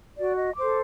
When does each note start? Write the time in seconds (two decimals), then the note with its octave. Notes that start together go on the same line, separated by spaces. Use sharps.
0.18 F#4 D5
0.37 D#5
0.56 A4 C5 D6